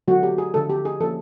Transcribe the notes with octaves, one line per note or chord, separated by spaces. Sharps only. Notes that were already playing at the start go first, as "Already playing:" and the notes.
D3 F#3 A3 F#4
G4
G#4
D3 F3 A3 A4
G4
G#4
F3 A#3 C#4 A4